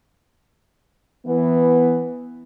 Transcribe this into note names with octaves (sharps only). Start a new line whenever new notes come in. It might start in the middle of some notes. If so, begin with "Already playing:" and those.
E3 B3